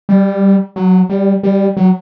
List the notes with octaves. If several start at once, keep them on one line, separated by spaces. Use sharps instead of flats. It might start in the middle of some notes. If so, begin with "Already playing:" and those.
G3
F#3
G3
G3
F#3